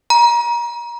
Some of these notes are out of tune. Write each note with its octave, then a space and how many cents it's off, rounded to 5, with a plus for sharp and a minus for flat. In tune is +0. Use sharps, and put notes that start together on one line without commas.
A#5 +30